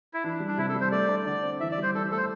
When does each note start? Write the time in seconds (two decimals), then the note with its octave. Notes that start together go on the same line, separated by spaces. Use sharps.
0.14 E4
0.24 E3 D4
0.40 G3
0.48 D4
0.58 C3 E4
0.69 A4
0.75 G3
0.81 C5
0.92 A3 D5
1.09 D4
1.26 D3 D5
1.43 C4
1.60 E3 E5
1.72 D5
1.78 G3 C5
1.94 E3 A4
2.11 A3 A4
2.17 C5